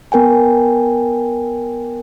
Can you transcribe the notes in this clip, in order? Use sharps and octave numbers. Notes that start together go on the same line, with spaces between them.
B3 A#4 G5 G#5